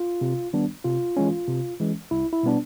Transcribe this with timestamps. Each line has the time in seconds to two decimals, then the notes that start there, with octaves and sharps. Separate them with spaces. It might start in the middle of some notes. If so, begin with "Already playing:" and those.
Already playing: F4
0.21 C3
0.53 D#3 G3 B3 D4
0.84 C3 F4
1.17 E3 G#3 C#4
1.48 C3
1.80 E3 G#3 C#4
2.11 C2 E4
2.33 E4
2.43 B2 G3 B3 D4